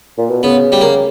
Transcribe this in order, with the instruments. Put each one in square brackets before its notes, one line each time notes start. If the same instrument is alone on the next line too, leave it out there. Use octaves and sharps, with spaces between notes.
[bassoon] A#2
B2
[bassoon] C#3 [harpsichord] B3
[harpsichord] G3
A#3